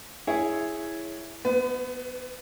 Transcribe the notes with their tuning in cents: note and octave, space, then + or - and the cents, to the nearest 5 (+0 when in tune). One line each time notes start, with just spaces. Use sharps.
E4 +0 G#4 +0 C#5 +0
B3 +0 B4 +40